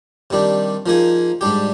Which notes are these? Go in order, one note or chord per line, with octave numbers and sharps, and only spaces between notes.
C3 D#3 G3 D4
F3 A#3 D#4 G#4
G#2 G3 D4 G4